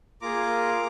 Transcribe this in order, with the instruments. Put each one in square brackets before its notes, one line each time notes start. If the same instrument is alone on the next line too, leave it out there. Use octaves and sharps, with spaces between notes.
[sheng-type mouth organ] A#3 F4 G#4 A#5 D6